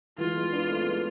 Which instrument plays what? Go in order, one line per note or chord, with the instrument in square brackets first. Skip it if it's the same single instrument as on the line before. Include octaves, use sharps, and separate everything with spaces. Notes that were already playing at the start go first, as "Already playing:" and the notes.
[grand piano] E3 G#3 [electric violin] F4
[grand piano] G#3 B3
B3 D4
A3 C4
G#3 B3